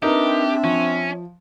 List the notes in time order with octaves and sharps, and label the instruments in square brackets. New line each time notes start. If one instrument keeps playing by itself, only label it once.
[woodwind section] C4 D4 [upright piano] D#4 A#4 B4 [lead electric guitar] G4 [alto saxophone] E5
[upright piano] F3 [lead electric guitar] C#4